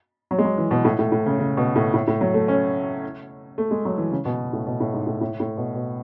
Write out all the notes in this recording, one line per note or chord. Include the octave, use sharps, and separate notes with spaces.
F#3
G#3
F#3
E3
B2
A2
A2
A2
C#3
C#3
B2
A2
A2
A2
F#3
A3
C#4
A3
G#3
F#3
E3
C#3
B2
A2
B2
A2
G#2
A2
A2
A2
B2
B2